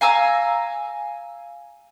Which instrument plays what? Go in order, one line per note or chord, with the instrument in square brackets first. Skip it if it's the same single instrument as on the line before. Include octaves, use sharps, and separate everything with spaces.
[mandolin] F5 G#5 A#5 E6